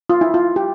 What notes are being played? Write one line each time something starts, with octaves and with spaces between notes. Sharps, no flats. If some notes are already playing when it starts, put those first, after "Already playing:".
F4
E4
F4
G4